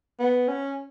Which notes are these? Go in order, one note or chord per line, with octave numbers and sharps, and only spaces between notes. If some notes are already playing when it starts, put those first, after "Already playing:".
B3
C#4